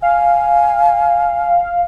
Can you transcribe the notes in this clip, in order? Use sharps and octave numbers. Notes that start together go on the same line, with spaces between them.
F5 G#5